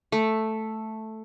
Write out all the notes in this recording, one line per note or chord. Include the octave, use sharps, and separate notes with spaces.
A3